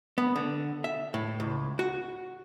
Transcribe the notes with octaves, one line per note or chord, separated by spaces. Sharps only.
B3
D3
E5
A2
C#2
F#4